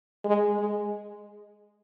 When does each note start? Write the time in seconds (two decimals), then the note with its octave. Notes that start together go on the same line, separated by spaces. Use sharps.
0.25 G#3
0.60 G#3